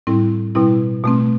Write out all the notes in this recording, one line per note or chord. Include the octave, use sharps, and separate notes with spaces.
A2 G3 C4 E4
B2 G3 C4 E4
B2 A3 C4